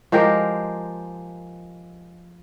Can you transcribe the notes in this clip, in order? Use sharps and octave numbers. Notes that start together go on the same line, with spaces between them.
F3 G#3 G4 A#4